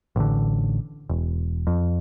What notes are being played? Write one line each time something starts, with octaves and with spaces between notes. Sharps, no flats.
A1 D3
E1
F2